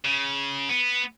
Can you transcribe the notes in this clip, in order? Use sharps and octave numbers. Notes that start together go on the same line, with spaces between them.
C#3
B3